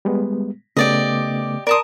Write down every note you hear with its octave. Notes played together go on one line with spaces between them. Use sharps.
G3 G#3 B3
C#3 A3 B3 G4 D5 D#5
A#4 D5 A5 C6 D#6